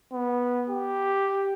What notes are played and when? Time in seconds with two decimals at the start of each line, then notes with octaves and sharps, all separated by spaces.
0.13 B3
0.70 G4